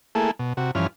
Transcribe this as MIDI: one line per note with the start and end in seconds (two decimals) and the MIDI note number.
0.15 0.31 57
0.15 0.31 58
0.15 0.31 64
0.15 0.31 68
0.15 0.31 69
0.39 0.53 47
0.57 0.71 48
0.57 0.71 66
0.75 0.87 43
0.75 0.87 52
0.75 0.87 53
0.75 0.87 61
0.75 0.87 89